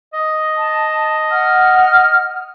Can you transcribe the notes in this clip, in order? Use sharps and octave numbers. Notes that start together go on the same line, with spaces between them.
D#5
A5
F#5 F6